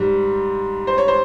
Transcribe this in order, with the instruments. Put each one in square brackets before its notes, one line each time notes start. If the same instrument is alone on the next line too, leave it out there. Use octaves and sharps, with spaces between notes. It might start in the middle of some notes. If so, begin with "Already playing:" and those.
Already playing: [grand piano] G#2 G3
C5
C#5
C5